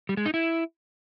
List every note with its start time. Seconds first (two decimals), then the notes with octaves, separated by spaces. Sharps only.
0.09 G3
0.17 G#3
0.26 D#4
0.34 E4